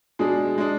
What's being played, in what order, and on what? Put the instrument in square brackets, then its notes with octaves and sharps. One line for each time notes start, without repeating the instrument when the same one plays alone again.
[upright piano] B2 G#3 D4 [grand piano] G#4
[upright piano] B2 G#3 D4